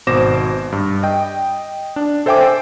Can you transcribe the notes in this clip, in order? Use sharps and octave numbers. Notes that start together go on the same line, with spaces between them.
G#1 B2 C5 D6 A#6 E7
G2
D#5 G5
D4
A4 C5 E5 G5 G#5 D6